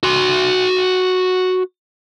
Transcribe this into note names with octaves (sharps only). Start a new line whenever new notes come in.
F#4 C6